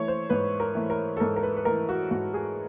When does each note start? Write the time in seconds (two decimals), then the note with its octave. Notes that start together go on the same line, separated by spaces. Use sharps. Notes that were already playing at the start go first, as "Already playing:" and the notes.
Already playing: E3 A3 C#5
0.08 C5
0.30 G#2 B4
0.60 A#4
0.75 E3 A3
0.90 A#4
1.17 A4
1.20 G#2 A#4
1.36 A#4
1.43 B4
1.57 B4
1.65 E3 A3 A#4
1.89 F#4
2.11 G#2 F#4
2.34 G#4